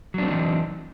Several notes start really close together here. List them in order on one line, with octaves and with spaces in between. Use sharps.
F#3 D4 C4 D#4 E3